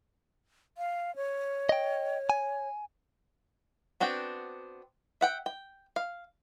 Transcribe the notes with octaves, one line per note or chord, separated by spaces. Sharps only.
F5
C#5
D#5 G5
G#5
B3 C4 D4 F#4 G5
E5 F#5 G5
G5
F5